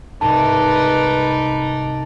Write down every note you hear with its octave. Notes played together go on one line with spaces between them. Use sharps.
C2 G#2 D#4 B4 D5 A5